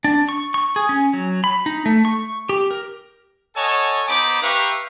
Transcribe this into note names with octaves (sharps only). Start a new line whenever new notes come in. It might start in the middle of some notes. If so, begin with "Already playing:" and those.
D4
C#6
C#6
G#4
C#4
F#3
B5
D#4
A3
C#6
G4
A#4
A4 C#5 D#5 F#5 G#5 A5
B3 D#4 C5 B5 D6
G4 B4 E5 F5 A#5 C#6